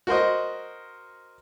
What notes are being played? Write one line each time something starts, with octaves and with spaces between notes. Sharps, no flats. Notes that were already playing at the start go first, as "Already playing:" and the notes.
F#4 A#4 C5 D#5